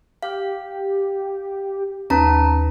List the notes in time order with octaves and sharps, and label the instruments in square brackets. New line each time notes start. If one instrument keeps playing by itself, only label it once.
[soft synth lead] G4 [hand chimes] F5
[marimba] D#2 [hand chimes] C#4 A5 A#5 [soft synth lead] B4